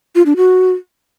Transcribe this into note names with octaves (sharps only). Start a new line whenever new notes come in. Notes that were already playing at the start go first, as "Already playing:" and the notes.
F4
D4
F#4